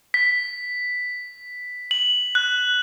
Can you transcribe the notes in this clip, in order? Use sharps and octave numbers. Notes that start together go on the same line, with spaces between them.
B6
F#7
F#6